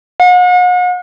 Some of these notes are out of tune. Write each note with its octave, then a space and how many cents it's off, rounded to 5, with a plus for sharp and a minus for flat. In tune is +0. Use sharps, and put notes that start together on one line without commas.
F#5 -40